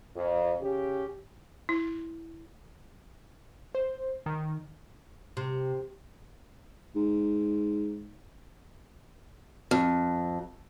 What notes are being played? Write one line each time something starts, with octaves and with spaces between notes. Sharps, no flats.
F2
C#3 C#4 G4
E4
C5
D#3
C3
G#2
F2